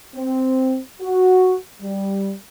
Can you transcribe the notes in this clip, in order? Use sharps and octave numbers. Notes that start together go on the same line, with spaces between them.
C4
F#4
G3